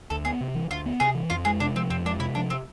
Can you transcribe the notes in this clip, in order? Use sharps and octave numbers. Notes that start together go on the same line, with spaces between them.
D2 A4
B3 G#4
C3
E3
D2 F4
B3
C3 G#4
E3
F2 F4
G#3 G#4
C3 D4
F3 C4
F2 C4
G#3 D4
C3 E4
F3 D4
C4